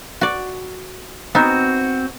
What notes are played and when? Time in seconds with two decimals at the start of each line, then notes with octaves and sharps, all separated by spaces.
0.21 F#4 D5
1.35 B3 C4 D#4 F#4